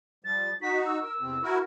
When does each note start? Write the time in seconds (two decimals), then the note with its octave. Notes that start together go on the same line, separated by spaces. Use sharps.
0.24 F3 G3 A6
0.62 D#4 F#4 B6
0.86 E6
1.02 A#4
1.20 E2 C3 C4
1.43 E4 F#4 A#4